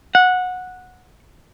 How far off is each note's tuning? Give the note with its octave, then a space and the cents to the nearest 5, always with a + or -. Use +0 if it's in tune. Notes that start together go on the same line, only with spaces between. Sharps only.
F#5 -15